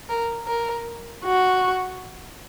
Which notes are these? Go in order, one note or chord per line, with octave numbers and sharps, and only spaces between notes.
A#4
A#4
F#4